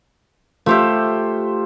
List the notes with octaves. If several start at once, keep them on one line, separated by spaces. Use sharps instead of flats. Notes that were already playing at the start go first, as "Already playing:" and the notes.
A3 F4 G4 C5 E5